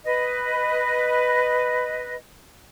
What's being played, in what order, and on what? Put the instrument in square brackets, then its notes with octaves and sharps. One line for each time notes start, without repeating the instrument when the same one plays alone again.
[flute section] B4 D#5